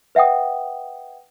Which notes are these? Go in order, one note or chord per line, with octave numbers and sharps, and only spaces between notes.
B4 E5 F#5 G5 D#6